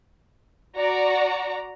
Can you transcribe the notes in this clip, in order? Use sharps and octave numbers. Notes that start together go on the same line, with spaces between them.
F#4 D5 A#5